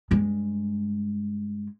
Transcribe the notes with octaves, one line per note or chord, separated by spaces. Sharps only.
G2 G#3